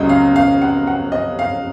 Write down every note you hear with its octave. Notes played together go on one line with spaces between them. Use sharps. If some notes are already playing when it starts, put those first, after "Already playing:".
Already playing: C#2 C#3 F#3 D#5
F5
F5
F#5
F#5
D#5
F5